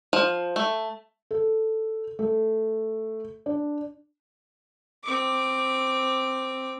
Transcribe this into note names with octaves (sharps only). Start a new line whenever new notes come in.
F3
A3
A4
A3
D4
C4 D6